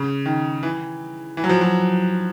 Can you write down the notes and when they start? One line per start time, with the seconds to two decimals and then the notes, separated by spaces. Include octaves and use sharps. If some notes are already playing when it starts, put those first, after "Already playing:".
Already playing: C#3
0.26 D#3
0.63 E3
1.37 E3
1.44 F#3
1.49 F3
1.61 F#3